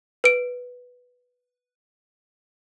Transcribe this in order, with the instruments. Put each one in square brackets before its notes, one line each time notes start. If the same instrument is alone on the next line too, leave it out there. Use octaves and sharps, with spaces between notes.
[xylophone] B4 D7